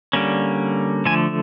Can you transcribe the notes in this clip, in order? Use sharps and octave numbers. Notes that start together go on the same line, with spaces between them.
D3 G3 A#3 C#4
D3 F3 A3 G#5